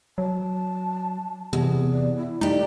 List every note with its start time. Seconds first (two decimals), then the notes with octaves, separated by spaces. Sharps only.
0.18 F#3 A5
1.53 E2 C3 B3
1.92 D5
2.16 E4
2.41 A3 D#4 G4 D5